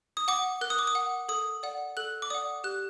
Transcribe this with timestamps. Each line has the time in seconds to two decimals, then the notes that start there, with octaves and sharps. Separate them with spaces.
0.17 D#6
0.28 F#5 D6
0.61 A#4 F#6
0.70 D#6
0.79 D6
0.87 D#6
0.95 F#5
1.29 A4 D#6
1.63 D5 F#5
1.97 A4 F#6
2.22 D6
2.30 D5 F#5 D#6
2.64 G4 F#6